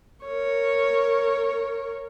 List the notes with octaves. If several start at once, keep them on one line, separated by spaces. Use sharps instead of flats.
A#4 C#5